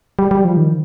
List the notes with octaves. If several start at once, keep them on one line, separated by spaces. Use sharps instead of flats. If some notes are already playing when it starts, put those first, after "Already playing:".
G3
G3
F3
D#3